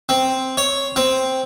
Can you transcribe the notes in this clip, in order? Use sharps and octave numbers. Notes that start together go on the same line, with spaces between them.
C4
C#5
C4